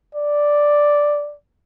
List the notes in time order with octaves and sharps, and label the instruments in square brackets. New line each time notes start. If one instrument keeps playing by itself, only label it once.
[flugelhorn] D5